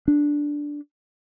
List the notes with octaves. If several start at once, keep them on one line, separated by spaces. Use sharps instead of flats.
D4